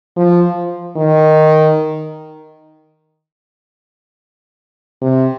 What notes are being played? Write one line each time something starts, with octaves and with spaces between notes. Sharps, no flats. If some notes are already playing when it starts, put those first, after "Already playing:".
F3
D#3
C3